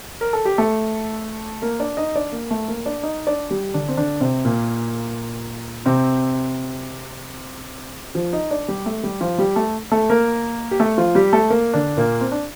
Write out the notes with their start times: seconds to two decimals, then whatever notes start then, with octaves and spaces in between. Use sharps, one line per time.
0.21 A#4
0.33 A4
0.45 G4
0.58 A3 A4
1.62 A#3 A#4
1.80 D4 D5
1.97 D#4 D#5
2.15 D4 D5
2.32 A#3 A#4
2.51 A3 A4
2.68 A#3 A#4
2.86 D4 D5
3.03 D#4 D#5
3.27 D4 D5
3.50 G3 G4
3.74 D3 D4
3.88 C4
3.97 D3 D4
4.20 C3 C4
4.45 A#2 A#3
5.86 C3 C4
8.15 F3 F4
8.33 D#4 D#5
8.51 D4 D5
8.68 G3 G4
8.86 A3 A4
9.03 G3 G4
9.21 F3 F4
9.38 G3 G4
9.56 A3 A4
9.92 A3 A4
10.10 A#3 A#4
10.71 G4
10.80 A3 A4
10.98 F3 F4
11.15 G3 G4
11.33 A3 A4
11.50 A#3 A#4
11.74 D3 D4
11.97 A#2 A#3
12.21 C4
12.32 D4